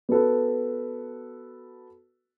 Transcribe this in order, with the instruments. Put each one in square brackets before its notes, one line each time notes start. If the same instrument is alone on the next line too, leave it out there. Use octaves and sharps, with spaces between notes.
[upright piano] B3 F#4 A4 B4